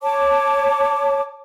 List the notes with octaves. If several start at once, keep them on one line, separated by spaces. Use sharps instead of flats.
C#5 A5 D6